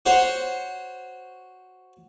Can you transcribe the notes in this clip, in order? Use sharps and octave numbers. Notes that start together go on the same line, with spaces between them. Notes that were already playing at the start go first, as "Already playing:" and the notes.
F#4 C5 C#5